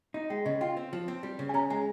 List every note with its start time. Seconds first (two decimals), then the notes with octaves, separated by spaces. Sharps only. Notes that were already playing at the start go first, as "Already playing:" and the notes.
0.14 D#4
0.30 G#3 G5
0.46 C#3 D#5
0.61 F4 G5
0.77 C4
0.93 F3
1.08 C4
1.23 G3
1.39 C#3
1.49 G#5
1.54 C#4 A#5
1.70 G#3 G#5